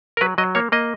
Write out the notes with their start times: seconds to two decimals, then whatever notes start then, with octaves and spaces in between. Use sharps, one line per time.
0.17 A#4
0.21 F#3 B4
0.38 F#3 D#5
0.55 A#3 C#5
0.72 A#3 D#5